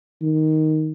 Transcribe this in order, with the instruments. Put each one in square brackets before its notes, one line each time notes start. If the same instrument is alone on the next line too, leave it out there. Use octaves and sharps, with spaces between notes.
[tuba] D#3